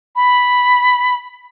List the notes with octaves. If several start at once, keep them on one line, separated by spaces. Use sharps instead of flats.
B5